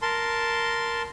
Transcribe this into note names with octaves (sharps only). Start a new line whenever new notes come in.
A#4 A5 C6